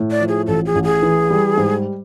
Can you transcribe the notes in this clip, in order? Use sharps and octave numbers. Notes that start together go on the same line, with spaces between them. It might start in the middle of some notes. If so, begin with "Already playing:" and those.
Already playing: A2
D5
F3
G#4
A1 A4
G#4
A1
G#4
E3
G3
G#2